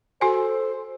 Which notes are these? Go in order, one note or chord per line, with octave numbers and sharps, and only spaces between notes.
F#4 A4 C5 G#5